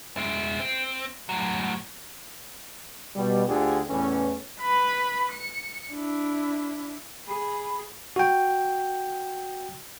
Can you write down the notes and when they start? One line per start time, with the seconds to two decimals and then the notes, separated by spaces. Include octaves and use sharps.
0.17 G#3 E4
0.60 C4
1.29 A2 F#3
3.16 B2 G3
3.46 D2 D3 F4 G4 G#4
3.89 E2 A2 E3 C#4
4.61 B4 B5
5.32 C#7
5.92 D4 E4
7.28 G#4 B5
8.16 F#4 G5